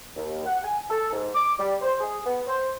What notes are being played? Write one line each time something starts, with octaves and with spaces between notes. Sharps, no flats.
D#2
F#5
G#5
A4
G#2
D6
G3
C5
G#4
B3
C5